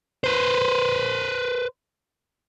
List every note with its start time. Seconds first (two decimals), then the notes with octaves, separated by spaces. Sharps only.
0.24 B4 C5